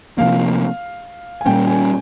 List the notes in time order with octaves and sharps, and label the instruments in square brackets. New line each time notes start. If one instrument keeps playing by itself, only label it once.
[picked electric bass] C3 F3 A#3 [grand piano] F5
[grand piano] G#5
[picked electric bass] A#2 G3 A#3 C#4 [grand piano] G5
[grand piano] G#5